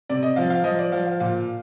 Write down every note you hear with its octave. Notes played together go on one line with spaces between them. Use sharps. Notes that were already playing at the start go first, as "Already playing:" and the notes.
C3 D5
D#5
F3 F5
F5
F3 D#5
D5
F3 F5
F5
A#2 F5